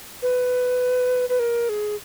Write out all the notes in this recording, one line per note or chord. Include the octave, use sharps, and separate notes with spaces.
B4
B4
A#4
G#4